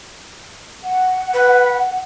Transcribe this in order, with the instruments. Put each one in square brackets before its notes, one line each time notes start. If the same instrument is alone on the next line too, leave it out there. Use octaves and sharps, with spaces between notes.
[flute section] F#5
[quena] B4